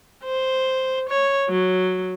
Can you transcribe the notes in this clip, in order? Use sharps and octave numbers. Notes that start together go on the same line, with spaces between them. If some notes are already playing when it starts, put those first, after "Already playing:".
C5
C#5
F#3